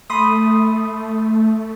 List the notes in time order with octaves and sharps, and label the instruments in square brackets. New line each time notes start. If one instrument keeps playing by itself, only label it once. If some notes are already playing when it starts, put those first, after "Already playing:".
[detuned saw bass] A3 [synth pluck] B5 C6 D#6